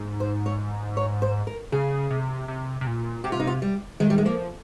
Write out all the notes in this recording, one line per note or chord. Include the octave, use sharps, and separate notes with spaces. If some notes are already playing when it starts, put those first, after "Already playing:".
Already playing: G#2
C5
C#5
C#5
C5
A#4
C#3 G#4
C3
C3
C3
A#2
C3 G4
F4
D#4
F4
G3
D#3 G#3
G3
G#3
F3 A#3